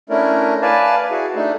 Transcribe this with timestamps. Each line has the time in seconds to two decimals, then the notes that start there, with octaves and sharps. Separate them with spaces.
0.10 A3 C#4 D4 E4 A#4
0.62 B4 D5 F5 G#5 A5
1.11 E4 F#4 G#4
1.36 A3 D4 D#4